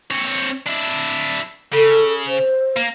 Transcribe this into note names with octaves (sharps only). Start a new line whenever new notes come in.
C4 C#5
D4 E4
C#3 A4
C5
A#3